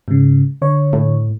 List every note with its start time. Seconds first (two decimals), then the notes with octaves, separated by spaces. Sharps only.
0.08 G#2 C#3
0.62 D3 C#5
0.93 A2